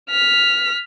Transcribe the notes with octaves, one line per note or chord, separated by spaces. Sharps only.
F6 B6